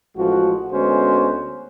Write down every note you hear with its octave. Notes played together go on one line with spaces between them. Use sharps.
A1 F3 G#3 F#4
D2 G#3 B3 C#4 F#4 C5